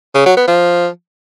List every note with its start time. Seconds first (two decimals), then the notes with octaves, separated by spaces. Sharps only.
0.15 C#3
0.26 F#3
0.37 B3
0.48 F3